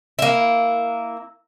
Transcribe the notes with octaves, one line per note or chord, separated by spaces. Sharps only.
A#3 E4